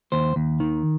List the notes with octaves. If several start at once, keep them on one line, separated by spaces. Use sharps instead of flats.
D#2 C5
D#2
D#3